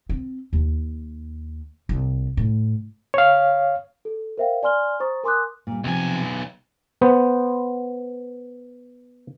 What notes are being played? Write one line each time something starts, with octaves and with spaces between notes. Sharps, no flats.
C4
D#2
C2
A2
C#5 F5
A4
A#4 C5 E5 F5 G5
D5 G#5 C6 F6 G7
C5 A#5 C#6 D#6 A6
A#4 G#5 C6 D6 D#6 F#6
A#2 G3
B1 C3 E3 F3 G#5
B3 C5